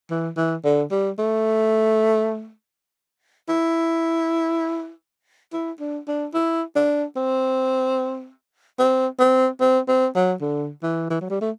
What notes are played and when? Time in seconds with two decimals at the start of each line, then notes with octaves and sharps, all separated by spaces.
0.10 E3
0.37 E3
0.64 D3
0.91 G3
1.18 A3
3.49 E4
5.53 E4
5.80 D4
6.08 D4
6.34 E4
6.76 D4
7.16 C4
8.79 C4
9.19 C4
9.61 C4
9.88 C4
10.15 F#3
10.41 D3
10.83 E3
11.10 E3
11.21 F#3
11.30 G3
11.41 A3